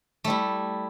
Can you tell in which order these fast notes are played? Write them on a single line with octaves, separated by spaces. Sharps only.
A3 G3 E4